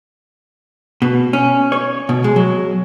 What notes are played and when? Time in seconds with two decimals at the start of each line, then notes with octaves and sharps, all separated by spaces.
1.02 B2
1.33 C#4
1.72 C#5
2.09 B2
2.24 G#3
2.36 F#3